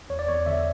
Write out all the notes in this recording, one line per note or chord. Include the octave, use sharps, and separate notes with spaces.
E2 C#5
D5
E2 C#5
D3 E5